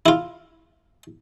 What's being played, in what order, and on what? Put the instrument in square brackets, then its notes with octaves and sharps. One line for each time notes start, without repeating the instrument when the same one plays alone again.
[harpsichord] E4 F4